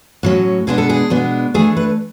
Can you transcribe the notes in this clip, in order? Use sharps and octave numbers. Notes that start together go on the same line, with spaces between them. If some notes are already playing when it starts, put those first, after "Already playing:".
A2 F#3 C#4
B2 G#3 B3 D4 G#4
A4
G#4
B2 G#3 B3 D4
E3 A3 D4 G#4
B4